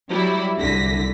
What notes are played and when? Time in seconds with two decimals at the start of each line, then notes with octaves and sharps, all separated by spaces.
0.11 F#3 G3 E4
0.60 C2 D3 A#6 B6